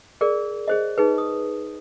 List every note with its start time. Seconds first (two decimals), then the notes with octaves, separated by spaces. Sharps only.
0.21 G#4 A#4 D5
0.68 G#4 C5 D#5
0.98 D#4 G#4 B4
1.18 D#6